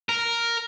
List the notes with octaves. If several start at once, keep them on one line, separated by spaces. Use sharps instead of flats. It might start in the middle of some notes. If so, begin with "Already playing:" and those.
A#4